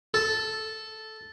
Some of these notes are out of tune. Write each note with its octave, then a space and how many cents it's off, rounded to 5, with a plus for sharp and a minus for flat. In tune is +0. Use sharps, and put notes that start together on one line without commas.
A4 -5